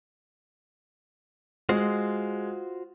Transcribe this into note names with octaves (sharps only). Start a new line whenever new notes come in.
G#3 F4 F#4 C5